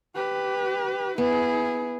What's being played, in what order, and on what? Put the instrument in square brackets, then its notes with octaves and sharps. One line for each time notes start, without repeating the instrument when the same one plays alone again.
[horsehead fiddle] G4 B4
[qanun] B3 [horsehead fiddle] E4 G#4